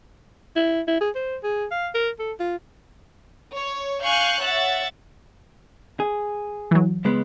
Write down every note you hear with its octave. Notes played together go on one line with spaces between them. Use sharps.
E4
E4
G#4
C5
G#4
F5
A#4
A4
F4
C#5
F5 G#5 C#6 F#6 G6
C#5 E5 F#5 A6
G#4
E3 F#3
C#2 G#3 B3